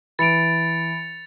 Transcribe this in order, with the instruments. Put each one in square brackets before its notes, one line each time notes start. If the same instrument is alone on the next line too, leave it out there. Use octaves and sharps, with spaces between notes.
[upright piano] E3 [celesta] B5 D7 [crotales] A6 C#7 F7